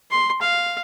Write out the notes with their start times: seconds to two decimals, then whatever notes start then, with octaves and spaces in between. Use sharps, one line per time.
0.11 C6
0.41 F5